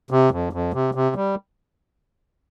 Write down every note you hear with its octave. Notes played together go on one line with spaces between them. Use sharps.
C3
F2
F2
C3
C3
G3